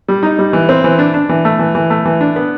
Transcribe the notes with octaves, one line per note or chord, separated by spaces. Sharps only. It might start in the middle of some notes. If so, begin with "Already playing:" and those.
G3
D#4
G3
E3
C4
E3
D4
D4
E3
A3
E3
E3
A3
E3
D4
B3